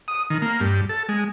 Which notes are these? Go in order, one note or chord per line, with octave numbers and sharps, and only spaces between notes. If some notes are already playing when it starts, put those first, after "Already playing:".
D#6
D#3
A#3
G2
A4
G#3